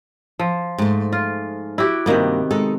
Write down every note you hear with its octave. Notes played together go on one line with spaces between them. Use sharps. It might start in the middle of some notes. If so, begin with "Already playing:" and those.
F3
G#2 A3
F4
E4 F#4 G4
G2 C3 D#3 A#3 B3
G#3 D#4 A4